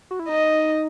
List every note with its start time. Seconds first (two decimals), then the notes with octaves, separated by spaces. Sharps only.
0.11 F#4
0.19 E4
0.28 D#4 D#5